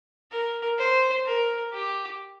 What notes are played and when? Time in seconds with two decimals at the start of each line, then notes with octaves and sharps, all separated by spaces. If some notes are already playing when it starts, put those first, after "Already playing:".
0.31 A#4
0.78 C5
1.26 A#4
1.73 G4